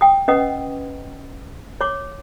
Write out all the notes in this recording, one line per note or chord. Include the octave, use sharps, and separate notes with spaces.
G5 D#6
C#4 B4 D#5 F#5 D#6
C#5 D6